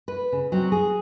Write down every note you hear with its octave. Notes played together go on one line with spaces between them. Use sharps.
B4
C#3
F#3 C4
G#4